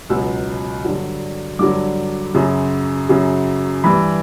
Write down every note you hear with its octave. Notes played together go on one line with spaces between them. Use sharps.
C#2 B2 F#3 E6
G2 D3 F#3
G2 D3 F#3 D6
F#2 C#3 F#3
F#2 C#3 F#3
G2 E3 B5